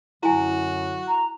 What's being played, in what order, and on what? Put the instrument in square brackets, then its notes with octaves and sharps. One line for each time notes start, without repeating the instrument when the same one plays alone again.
[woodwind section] F#2 D3 F#3 [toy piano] E4 G#5 [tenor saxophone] F#4
[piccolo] A#5